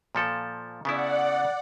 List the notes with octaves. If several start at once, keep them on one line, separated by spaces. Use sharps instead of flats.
A#2 F3 A4
C#3 B3 E4 D5 F#5